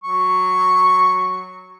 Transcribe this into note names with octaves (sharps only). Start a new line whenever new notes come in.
F#3 C#6